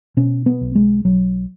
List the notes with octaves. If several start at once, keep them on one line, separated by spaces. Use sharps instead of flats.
B2 C#4
B3
B1
G#3
B1 F#3